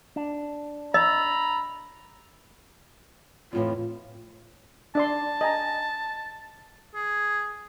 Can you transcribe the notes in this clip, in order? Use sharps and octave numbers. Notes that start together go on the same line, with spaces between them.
D4
D#5 A#5 B5 E6
F2 A2 E3 F4
D4 D5 A5 C6
D#5 G#5 A#5
G#4